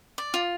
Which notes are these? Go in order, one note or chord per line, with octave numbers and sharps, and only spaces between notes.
D5
F4